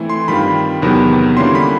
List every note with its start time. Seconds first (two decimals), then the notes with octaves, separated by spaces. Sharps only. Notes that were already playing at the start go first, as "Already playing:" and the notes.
Already playing: E3 A3 C4 E4
0.10 C6
0.28 G2 D#3 G3 C4 F4 B5
0.82 E2 C3 D#3 F#3 B3
1.37 D3 G3 A#3 C#4 E4 C6
1.55 B5